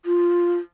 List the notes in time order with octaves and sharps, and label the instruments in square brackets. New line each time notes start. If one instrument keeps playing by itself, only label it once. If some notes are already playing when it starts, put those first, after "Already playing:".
[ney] F4